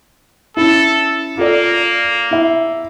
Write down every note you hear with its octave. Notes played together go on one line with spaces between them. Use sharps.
C#4 E4 A4
A#3 F4 A4 D5
E4 E5